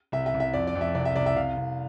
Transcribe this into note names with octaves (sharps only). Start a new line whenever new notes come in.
C2 E5
E5
C2
E5
F2 D5
D5
F2
E5
C2 D5
E5
C2 D5
E5
C2 F5
C2